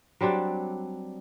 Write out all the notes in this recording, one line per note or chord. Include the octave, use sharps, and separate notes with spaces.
F#3 G3 C4 D4